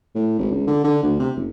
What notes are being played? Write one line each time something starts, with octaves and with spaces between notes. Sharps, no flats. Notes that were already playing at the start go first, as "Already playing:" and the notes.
A2
G#1
C#2
D3
D3
D2
C3
F#1